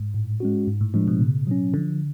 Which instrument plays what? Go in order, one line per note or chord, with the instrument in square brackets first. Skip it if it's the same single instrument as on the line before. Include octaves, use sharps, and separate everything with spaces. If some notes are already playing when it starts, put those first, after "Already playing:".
Already playing: [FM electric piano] G#2
[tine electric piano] A2
G#3 C#4 F#4
G#2
[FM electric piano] A2
[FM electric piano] A2 [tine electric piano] F3 G#3 D4
[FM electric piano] B2
[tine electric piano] C#3
F#3 C#4
[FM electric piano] D3 [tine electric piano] F3